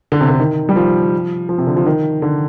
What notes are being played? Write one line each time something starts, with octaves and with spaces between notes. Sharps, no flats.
D3
C3
D3
D#3
G3
F3
F3
C3
D3
F3
D#3
D3